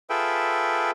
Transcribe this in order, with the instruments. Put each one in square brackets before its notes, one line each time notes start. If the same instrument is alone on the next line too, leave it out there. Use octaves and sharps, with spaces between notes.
[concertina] F4 G#4 A4 B4 E5 G5